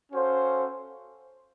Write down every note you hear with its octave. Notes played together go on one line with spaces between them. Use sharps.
C#4 F#4 A4 C5 F5